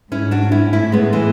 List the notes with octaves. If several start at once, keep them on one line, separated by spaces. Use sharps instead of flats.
G#2 C#4 E4
D4 F#4
C#4 E4
A2 C#4 E4
G#3 B3
E3 G#3